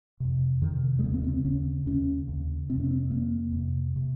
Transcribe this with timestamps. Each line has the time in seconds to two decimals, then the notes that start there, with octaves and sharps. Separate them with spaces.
0.20 F2 C3
0.61 F2 C3 D#3
0.99 G#3
1.03 D#2 C#3 A#3
1.14 C4
1.24 C4
1.34 C4
1.45 D#2 C#3 C#4
1.86 D#2 C#3 C#4
2.28 D#2 C#3
2.70 F2 C3 C4
2.80 C#4
2.91 C4
3.11 F2 C3 A#3
3.52 F2 C3
3.96 C3